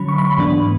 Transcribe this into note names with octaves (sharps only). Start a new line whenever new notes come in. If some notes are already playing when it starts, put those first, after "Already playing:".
Already playing: D3 F#3 C#4 B5
C#6
B5
G#2 E3 B3 D4